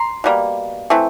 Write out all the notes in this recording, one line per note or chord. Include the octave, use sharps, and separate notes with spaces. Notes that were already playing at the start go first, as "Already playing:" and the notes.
Already playing: A#5 C6
B2 G3 A#3
E3 A3 C4